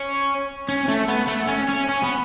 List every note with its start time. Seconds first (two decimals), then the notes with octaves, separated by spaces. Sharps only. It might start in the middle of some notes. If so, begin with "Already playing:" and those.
Already playing: C#4
0.69 C#4
0.88 A3
1.08 B3
1.28 A3
1.48 C#4
1.69 C#4
1.89 C#4
2.03 B3